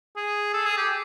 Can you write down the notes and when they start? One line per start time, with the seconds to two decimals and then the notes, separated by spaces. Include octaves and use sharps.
0.17 G#4
0.54 A4
0.66 G#4
0.78 G4